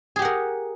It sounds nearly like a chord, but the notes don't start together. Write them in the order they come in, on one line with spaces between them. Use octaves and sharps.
G#4 G4 F#5 A#4